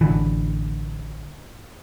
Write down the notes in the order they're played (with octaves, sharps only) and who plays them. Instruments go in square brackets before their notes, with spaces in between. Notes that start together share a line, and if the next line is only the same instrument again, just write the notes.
[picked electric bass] A1 D3 E3